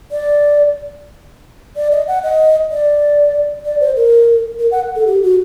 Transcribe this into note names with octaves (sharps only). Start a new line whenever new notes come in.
D5
D5
D#5
F#5
D#5
D5
D5
C5
A#4
A#4
F#5
A4
G4
F#4